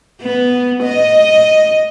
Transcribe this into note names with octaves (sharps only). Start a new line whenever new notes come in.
B3
D#5